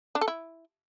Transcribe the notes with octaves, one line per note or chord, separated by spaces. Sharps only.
D4
A4
E4